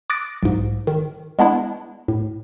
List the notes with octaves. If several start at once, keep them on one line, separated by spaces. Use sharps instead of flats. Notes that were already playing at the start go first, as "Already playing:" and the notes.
D6 D#6 F#6 A6 A#6 D7
B1 G#2
D#3
G#3 B3 D4 E4
A2